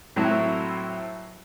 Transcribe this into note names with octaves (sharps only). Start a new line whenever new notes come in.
A2 F#3 C4 E4 F#4